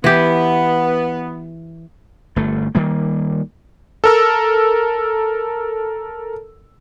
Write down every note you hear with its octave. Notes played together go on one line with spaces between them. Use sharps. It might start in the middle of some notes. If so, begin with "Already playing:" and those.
E3 B3 G4
G1 A3
D#3 G3 A#3
A4 A#4 E6